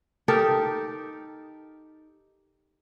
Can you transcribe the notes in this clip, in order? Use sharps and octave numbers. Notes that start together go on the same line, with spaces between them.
D#4 G4 A4 A#4